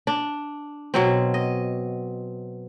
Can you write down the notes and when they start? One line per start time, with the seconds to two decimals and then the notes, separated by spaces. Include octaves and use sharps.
0.07 D4
0.94 B2 F#3 C4
1.34 D#5